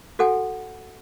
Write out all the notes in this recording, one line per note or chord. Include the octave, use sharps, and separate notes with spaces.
F#4 A4 F#5 G#5